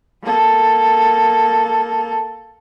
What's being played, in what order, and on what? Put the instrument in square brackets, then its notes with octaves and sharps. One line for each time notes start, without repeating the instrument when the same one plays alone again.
[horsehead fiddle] A#3 A4